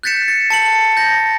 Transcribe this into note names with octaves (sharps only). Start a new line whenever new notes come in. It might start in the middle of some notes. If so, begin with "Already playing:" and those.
F#6 G6 A6 B6 C#7 E7
A6
A5 C#7 F#7
G6 A#6